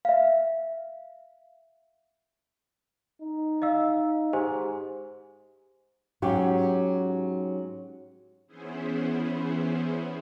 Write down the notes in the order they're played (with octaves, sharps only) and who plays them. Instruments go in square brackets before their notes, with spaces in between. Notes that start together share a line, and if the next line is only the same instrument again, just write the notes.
[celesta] E5 F5
[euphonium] D#4
[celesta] D#5 F5 E6
[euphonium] G#2 [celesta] G4 C5 G#5
[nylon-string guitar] G#2 F#3 C#4 F#4 G4
[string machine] E3 B3 C#4 E4 G#4 C5